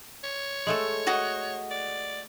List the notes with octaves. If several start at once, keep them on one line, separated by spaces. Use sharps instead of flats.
C#5
G#3 A3 A4
F#4 D#5
D5